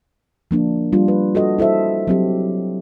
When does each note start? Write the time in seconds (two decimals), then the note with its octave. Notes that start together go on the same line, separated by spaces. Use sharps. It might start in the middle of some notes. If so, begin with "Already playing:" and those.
0.51 F3 A#3 D4
0.93 G3 D4 F4
1.08 B4
1.35 F#4 A4 D#5
1.58 E4 A4 C5 E5
2.07 F#3 C4 G4